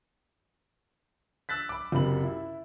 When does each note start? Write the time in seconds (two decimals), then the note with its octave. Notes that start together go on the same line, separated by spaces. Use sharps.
1.49 E6 F#6 A6 B6
1.69 B5 D6
1.92 F#1 C3 B5 F#7
2.23 E4